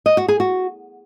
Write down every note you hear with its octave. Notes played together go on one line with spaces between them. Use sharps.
D#5
F#4
G#4
F#4